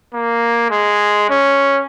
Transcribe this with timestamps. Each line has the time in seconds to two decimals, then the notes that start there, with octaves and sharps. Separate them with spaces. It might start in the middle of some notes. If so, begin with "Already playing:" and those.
0.14 A#3
0.70 G#3
1.30 C#4